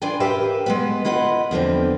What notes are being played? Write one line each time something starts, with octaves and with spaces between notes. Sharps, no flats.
E3 D4 F4 D5 G5 G#5
G4 A#4 B4 E5 F5 G5
G#3 B3 B4
E4 F4 B4 D#5 F#5
E2 D3 F3 C4